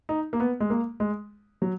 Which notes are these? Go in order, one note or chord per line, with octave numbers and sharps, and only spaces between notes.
D#4
A#3
B3
G#3
A#3
G#3
F#3